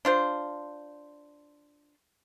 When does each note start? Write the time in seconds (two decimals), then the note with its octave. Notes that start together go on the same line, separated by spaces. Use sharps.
0.05 D4 F4 C5